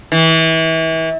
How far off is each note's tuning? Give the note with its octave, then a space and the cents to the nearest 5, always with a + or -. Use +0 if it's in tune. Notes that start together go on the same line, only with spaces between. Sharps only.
E3 -30